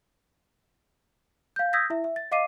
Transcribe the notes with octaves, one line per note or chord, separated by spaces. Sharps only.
F5 G6
D#6 E6 G6 G#6 A#6 B6
E4 E5
E5
A6
D#5 F5 D6 C7 D#7